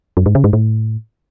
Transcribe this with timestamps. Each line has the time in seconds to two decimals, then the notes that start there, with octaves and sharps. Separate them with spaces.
0.17 F#2
0.26 G#2
0.35 C#3
0.44 G#2
0.53 A2